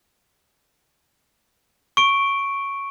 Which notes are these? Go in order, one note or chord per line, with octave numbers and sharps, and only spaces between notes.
C#6 D7